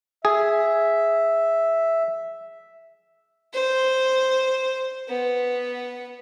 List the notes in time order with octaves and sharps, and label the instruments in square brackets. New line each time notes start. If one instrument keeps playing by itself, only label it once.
[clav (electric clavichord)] G#4 [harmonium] E5
[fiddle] C5
B3